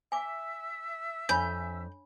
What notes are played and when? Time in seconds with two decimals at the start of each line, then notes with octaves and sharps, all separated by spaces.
0.12 E5 G#5 D6 E6
1.29 F2 D4 C#5 G#5 B5 G6